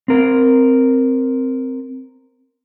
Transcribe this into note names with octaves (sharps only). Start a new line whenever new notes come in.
C4 A#4